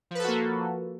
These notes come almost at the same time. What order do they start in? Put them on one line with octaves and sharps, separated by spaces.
F3 B4 A4 F#4 A#3